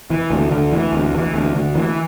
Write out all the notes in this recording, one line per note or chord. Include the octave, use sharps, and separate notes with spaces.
E3
D2
D2
E3
D2
E3
D2
D2
E3